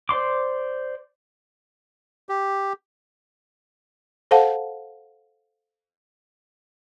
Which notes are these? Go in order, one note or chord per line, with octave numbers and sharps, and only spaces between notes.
C5 D5 C6 D6
G4
A4 C5 F5 F#5 A5